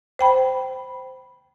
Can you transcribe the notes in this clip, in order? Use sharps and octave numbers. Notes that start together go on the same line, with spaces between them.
C5 G5 B5